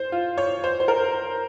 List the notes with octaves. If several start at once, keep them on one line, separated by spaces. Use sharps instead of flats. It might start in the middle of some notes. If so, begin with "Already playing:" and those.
Already playing: C5
F4
C#5
C5
C5
A#4